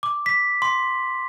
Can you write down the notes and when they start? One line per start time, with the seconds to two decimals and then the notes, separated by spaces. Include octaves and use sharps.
0.03 D6
0.26 B6
0.62 C6